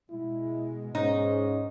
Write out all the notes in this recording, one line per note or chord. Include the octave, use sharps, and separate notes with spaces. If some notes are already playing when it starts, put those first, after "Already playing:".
B2 G#3 E4
G#2 C#4 D#4